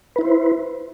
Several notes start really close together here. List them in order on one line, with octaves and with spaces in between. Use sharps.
B4 E4 C5